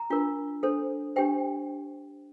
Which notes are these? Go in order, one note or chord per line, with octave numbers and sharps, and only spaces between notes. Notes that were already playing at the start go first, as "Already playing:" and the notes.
Already playing: A#5
D4 F4 A#4
D4 A4 C5
D4 G4 C5 G5